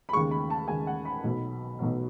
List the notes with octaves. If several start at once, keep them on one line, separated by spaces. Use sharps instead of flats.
B5
D#2 C#3 G#3 C#6
B5
A5
D#2 C#3 G#3 G#5
F#5
B5
B1 B2 F#3
B1 B2 F#3